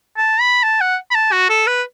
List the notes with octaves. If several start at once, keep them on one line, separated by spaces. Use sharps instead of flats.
A5
B5
A5
F#5
B5
A5
F#4
A4
B4